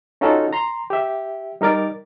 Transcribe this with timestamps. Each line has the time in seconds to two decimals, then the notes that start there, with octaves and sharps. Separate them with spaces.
0.21 C#4 D#4 F4 F#4 A4
0.53 A#5 C6
0.90 G4 E5
1.61 G3 D#4 A#4 D6 A6